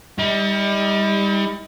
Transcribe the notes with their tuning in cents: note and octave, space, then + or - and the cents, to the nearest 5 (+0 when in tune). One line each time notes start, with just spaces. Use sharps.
G3 +25 D#4 +45